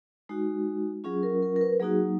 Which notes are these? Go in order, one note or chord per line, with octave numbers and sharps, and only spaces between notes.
G#3 D#4 F#4
F#3 C#4 F4 G#4
A#4
A#4
A#4
B4
F#3 A#3 D#4 F#4 G#4